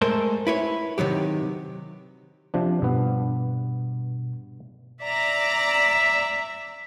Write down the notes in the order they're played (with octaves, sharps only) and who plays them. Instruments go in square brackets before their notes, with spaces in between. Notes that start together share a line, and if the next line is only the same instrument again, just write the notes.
[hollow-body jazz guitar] G#3 A3 A4 A#4 C5
E4 B4 C#5
C3 D#3 F#3 G4
[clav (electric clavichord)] C3 F3 D4
[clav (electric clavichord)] G2 B3 [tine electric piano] B2
[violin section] D5 A#5 [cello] E5